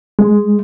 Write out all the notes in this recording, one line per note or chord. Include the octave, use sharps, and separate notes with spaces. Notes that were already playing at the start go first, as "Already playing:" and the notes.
G#3